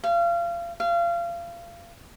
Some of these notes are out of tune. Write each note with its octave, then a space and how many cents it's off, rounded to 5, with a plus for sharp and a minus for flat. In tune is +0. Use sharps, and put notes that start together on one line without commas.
F5 -30
F5 -30